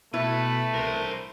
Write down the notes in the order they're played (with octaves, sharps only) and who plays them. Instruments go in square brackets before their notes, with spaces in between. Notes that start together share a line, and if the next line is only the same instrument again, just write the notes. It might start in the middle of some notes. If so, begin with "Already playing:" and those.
[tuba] B2 [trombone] A3 [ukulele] E4 [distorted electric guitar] B4
[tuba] C2 [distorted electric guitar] A#4 C5